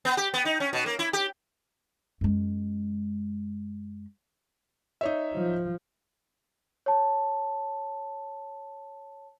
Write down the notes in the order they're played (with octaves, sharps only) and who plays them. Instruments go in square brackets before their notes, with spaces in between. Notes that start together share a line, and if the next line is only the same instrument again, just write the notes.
[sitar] B3
G4
B3
D#4
C#4
B2
A#3
E4
G4
[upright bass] F#2 G#3
[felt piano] D#4 C#5 E5
[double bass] F3
[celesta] C#5 A5